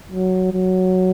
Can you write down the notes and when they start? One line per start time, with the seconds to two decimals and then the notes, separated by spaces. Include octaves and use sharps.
0.11 F#3
0.53 F#3